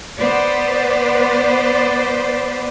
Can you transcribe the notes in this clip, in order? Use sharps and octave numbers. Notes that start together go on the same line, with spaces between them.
B3 B4 C5 D5